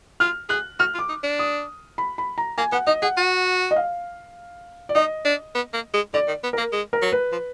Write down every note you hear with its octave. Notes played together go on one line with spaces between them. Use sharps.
F4 F6
G#4 F#6
F#4 F6
F4
D6
D#4
D4
D#6
B5
B5
A#5
A#3 G#5
B3 F#5
D#4 D#5
G#4 F#5
F#4
D#5
F5
D5
D#4 D#5
D4
B3
A#3
G#3
D3 D5
D#3
B3
A#3 A#4
G#3
A#4
F#3
B4
F3